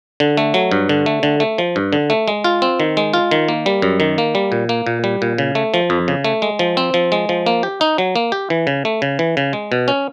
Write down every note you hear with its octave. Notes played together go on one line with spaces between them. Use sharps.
D3
A3
F#3
G2
D3
A3
D3
A3
F3
G2
D3
A3
G#3
F4
C4
D#3
G#3
F4
D#3
A#3
G3
F#2
D#3
A#3
G3
A#2
A#3
A#2
G3
A#2
C#3
A3
F3
F2
C#3
A3
G#3
F3
C4
F3
G#3
F3
A#3
G4
D#4
F#3
A#3
G4
E3
C#3
A3
C#3
E3
C#3
G#3
B2
C#4